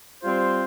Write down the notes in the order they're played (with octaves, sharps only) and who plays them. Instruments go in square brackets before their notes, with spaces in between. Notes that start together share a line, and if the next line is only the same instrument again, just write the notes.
[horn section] G3 C4 F4 C5